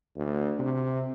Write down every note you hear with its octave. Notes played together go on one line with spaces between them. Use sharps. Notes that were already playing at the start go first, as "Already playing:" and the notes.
D2
C3